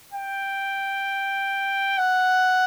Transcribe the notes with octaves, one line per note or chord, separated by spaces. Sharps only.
G5
F#5